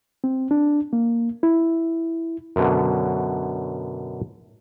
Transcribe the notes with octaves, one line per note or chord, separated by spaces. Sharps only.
C4
D4
A#3
E4
F#2 B2 D3